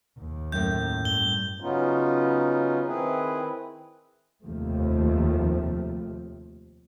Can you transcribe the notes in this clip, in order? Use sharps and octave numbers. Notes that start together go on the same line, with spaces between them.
D#2
F#2 A2 G6
G2 G7
C#3 F#3 B3 C#4 D#4 F4
D#3 C4 E4 G#4 B4
F1 D#2 C3 F3 A3